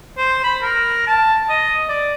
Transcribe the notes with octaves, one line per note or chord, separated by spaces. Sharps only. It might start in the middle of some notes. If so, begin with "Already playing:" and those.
C5
B5
A#4
A5
D#5
D5